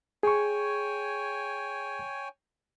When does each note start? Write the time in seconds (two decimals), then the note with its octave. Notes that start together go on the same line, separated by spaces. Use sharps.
0.23 G#4 C#5 G5 G#5 C#6